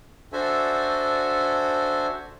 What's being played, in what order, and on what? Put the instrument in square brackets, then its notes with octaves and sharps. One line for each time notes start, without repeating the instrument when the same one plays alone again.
[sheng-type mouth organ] D4 F#4 A4 C5 E5 G#5